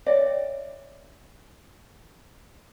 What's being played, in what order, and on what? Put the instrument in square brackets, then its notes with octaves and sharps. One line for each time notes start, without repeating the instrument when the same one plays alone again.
[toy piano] C#5 E5 G5 [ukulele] D5